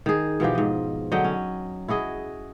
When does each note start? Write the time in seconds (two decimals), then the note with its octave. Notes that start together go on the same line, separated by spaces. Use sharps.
0.06 D#3 G#4
0.40 B2 E3 F3 G4
0.55 G#2 D#5
1.12 D3 F#3 D#5 G5
1.24 C#4
1.88 E4 F#4 G#4 D#5